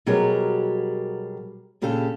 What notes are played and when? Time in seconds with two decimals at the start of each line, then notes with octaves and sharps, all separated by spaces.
0.06 B2 F#3 G3 G4 G#4 A#4
1.82 A#2 C#3 D4 G4 A4